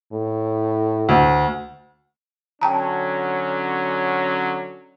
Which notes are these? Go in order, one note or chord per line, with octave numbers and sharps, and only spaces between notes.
A2
D2
D3 F#3 C#4 G5 A5 A#5